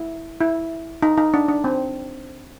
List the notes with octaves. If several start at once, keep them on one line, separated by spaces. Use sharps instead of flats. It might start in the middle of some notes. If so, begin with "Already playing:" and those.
Already playing: E4
E4
D#4
D#4
D4
D4
C4